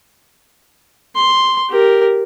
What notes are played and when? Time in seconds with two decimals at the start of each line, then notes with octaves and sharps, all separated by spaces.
1.15 C6
1.69 G4 A#4